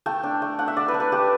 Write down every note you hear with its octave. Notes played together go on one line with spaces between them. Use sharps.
A3 G5
D4
A3
D4 F#5
E5
A3 D5
B4
D4
B4
A3 G4